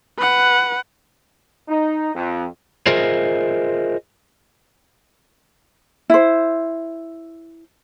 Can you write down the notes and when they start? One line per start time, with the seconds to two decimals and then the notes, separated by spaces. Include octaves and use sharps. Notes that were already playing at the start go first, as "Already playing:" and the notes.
0.18 B4 F#5
1.68 D#4
2.14 F2
2.86 F4 G#4 A#4 C5 D#5 E5
6.10 E4 C5